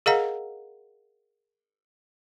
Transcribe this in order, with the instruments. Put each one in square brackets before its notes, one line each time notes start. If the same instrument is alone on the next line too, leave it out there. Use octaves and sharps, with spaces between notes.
[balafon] G#4 A#4 D#5 F5 F#5 A#5